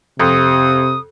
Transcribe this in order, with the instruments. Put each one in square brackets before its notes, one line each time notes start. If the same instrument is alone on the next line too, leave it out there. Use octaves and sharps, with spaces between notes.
[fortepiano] F2 [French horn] C3 [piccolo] D#6